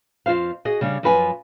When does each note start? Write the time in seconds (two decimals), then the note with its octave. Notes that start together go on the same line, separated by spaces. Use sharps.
0.26 F2 F4 C5 F5
0.65 F#4 G#4 D#5
0.81 C#3 G3 C#4 D4
1.03 F#2 F3 F4 B4 G5 G#5